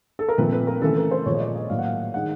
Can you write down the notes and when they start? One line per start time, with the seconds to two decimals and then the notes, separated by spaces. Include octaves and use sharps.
0.19 A4
0.29 A#4
0.38 A#2 F3 A3 C4 B4
0.52 B4
0.67 A#4
0.82 C#3 E3 A3 A4
0.97 A#4
1.11 C5
1.26 A#2 F3 G#3 C#5
1.35 D#5
1.40 D5
1.55 D#5
1.70 A2 F#3 A#3 F5
1.79 F#5
1.84 F5
2.14 D#3 G#3 F#5